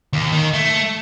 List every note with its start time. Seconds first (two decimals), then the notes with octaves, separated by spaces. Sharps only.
0.13 D#2
0.32 D#3
0.53 A3